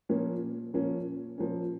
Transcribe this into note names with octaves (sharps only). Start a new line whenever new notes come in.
A#2 F3 A#3 C#4
A#2 F3 A#3 C#4
A#2 F3 A#3 C#4